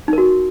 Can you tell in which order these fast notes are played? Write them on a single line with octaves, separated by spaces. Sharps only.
D#4 A#4 F#4